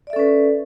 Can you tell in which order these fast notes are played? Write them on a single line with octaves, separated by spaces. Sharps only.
D5 E5 A4 C#4 B4